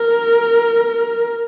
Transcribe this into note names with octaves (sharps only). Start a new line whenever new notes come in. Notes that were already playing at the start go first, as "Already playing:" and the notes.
Already playing: A#4